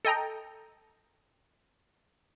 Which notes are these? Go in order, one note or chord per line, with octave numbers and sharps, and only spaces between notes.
A4 D#5 G5 A#5